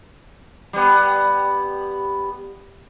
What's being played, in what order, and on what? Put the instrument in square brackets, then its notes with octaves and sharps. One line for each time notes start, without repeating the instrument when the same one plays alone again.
[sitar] G3 B3